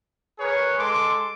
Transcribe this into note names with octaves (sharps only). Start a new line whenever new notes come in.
G#4 A#4 B4 C#5
G#3 A4 C6 D6